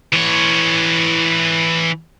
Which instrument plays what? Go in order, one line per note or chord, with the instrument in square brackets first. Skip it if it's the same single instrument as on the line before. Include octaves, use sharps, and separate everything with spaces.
[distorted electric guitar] E3 C#5